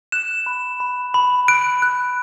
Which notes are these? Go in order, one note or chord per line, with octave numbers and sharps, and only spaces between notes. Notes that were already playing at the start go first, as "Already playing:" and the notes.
F#6 E7
B5
B5
B5
F#6 D7
F#6